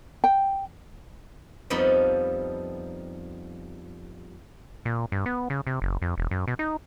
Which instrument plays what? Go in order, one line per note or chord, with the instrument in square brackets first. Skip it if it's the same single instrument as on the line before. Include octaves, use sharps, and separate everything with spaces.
[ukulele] G5
[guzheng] F2 F3 G3 B3 D#4 B5
[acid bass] A#2
G2
B3
C#3
C3
F#1
F2
E1
F#2
B2
D#4